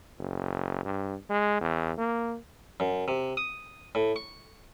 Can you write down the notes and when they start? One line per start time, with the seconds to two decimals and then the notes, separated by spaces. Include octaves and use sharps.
0.19 F#1
0.85 G2
1.30 G#3
1.61 E2
1.98 A#3
2.80 F#2
3.08 C3
3.37 D#6
3.95 A2
4.16 C#6